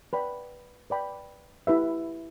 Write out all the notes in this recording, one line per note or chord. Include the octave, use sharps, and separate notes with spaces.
B4 D5 G5 B5
B4 D5 G5 B5
E4 G4 B4 E5